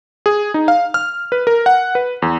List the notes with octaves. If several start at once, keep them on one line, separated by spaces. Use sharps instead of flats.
G#4
D#4
F5
F6
B4
A#4
F#5
B4
E2